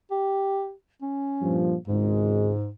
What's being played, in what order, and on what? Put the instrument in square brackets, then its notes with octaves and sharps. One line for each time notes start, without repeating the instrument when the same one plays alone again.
[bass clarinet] G4
C#4
[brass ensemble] G2 A#2 F3
[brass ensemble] G#1 C#2 G#3 [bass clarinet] G#2